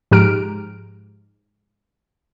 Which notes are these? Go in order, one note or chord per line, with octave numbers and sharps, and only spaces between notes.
G#2 F3 G4 A#5 F6 D7